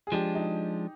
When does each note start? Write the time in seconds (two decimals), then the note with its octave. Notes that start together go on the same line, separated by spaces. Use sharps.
0.07 G#4
0.12 F3 G#3 D4 G4
0.35 D#4